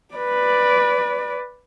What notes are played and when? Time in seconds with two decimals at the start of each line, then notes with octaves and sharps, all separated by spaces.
0.15 B4 D5